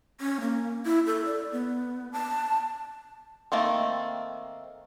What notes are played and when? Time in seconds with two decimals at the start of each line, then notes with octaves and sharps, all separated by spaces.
0.21 C#4
0.41 A#3
0.85 E4
1.06 A4
1.26 D5
1.52 B3
2.12 A5
3.52 D#3 A3 A#3 C4